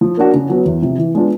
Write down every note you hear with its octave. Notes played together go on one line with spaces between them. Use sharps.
F3
A#3 D4 F#4
C#3
F#3 B3
E2
C3 F3
E3
G#3 B3 D4 F4